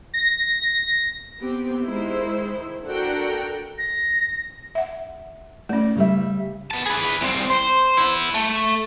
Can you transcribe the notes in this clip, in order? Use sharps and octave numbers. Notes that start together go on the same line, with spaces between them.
A#6
B3 C4 G4
D#3 G#3 E4 C5
D4 F#4 A4 A#4 F#5 G5
A#6
E5 F#5
A3 C#4 D5
C#3 G3 E5
B3 A5
G#4 B4
C2 C4
C5
B3 E4
A3